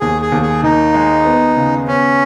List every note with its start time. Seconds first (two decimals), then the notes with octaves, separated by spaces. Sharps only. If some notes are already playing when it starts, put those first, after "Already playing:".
0.01 D#2 G#4
0.22 G#4
0.32 D#2
0.42 G#4
0.63 D#3 D#4
0.94 G#3
1.25 B3
1.57 C#3
1.87 B3 C#4